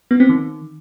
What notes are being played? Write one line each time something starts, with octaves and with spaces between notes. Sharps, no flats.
B3
C4
D#3